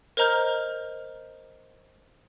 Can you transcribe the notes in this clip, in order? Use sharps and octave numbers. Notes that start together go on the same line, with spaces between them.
A#4 C5 D#5 A#5 F6 G6